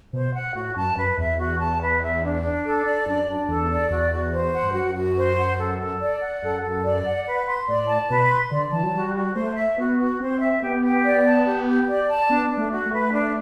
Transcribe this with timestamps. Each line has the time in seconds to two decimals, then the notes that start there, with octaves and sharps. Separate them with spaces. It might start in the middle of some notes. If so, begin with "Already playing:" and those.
0.13 B2 C5
0.34 F#5
0.55 A2 F#4
0.76 F#2 A5
0.97 F#2 B4
1.18 E2 E5
1.38 F#4
1.60 A5
1.81 B4
2.02 E5
2.23 D4
2.43 D4
2.65 A4
2.85 D5
3.06 F#2 D4
3.27 D4
3.48 E2 A4
3.70 D5
3.90 E2 F#4
4.11 F#4
4.33 C5
4.54 F#5
4.63 G2
4.74 F#2 F#4
4.95 F#4
5.16 C5
5.38 F#5
5.58 A4
5.79 A4
6.01 D5
6.21 F#5
6.42 F#2 A4
6.63 A4
6.84 D5
7.06 F#5
7.27 B4
7.48 C6
7.68 A2 D5
7.88 A5
8.09 B2 B4
8.31 C6
8.51 D3 D5
8.72 E3 A5
8.83 F#3
8.94 G3 F#4
9.14 F#4
9.35 A3 C5
9.56 E5
9.78 B3 F#4
9.98 F#4
10.20 C4 C5
10.40 E5
10.61 B3 G4
10.83 G4
11.04 D5
11.25 A5
11.46 G4
11.66 G4
11.88 D5
12.09 A5
12.29 B3 D4
12.50 D4
12.57 A3
12.71 F#4
12.86 A3
12.92 B4
13.13 D4